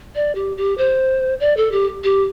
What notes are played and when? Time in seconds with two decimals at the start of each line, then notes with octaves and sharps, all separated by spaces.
0.15 D5
0.35 G4
0.57 G4
0.78 C5
1.40 D5
1.57 A4
1.72 G4
2.04 G4